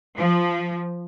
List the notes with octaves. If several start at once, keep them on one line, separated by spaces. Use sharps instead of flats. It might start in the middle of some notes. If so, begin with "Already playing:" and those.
F3